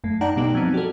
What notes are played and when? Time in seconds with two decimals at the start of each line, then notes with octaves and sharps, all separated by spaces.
0.04 F#2 A3
0.21 D#4 D5 F#5 G5 A5 A#5
0.36 B2 G3 B3 D#4
0.55 F3 F#3 C4
0.74 F#4 A4